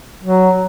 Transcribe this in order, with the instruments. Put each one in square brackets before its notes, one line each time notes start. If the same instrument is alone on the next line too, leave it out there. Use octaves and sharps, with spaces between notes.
[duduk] F#3